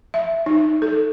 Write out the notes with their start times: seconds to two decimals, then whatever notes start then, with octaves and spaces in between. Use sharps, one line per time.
0.14 E5
0.46 D#4
0.82 A4